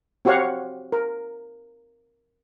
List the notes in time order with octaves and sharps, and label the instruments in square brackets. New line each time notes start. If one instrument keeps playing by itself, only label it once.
[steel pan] C4 F#4 G4 C#5 F5 F#5
A#4